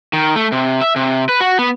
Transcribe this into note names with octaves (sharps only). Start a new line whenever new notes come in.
D#3
A3
C3
E5
C3
B4
F#4
B3